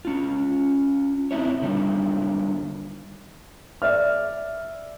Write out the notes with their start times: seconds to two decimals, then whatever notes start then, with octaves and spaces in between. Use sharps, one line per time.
0.05 C#4 F4
1.31 C4 D#4 E4 C#5
1.62 D3 D#3 F#3 G3
3.82 D5 E5 F6